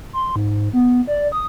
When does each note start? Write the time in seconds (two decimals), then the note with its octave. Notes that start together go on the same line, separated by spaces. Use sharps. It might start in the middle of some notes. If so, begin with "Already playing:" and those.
0.13 C6
0.36 G#2
0.73 B3
1.07 D5
1.32 D#6